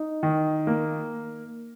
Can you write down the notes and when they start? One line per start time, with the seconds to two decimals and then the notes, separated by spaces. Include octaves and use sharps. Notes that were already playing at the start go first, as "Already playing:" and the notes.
Already playing: D#4
0.23 D#3
0.67 A#3